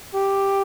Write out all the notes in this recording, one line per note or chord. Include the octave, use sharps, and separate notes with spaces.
G4